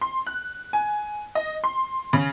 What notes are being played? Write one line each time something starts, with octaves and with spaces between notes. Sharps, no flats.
C6
F#6
G#5
D#5
C6
C#3